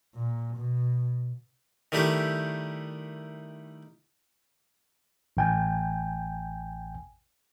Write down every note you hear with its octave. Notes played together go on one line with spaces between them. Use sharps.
A#2
B2
D#3 G3 A3 E4 G4
A1 G5 G#5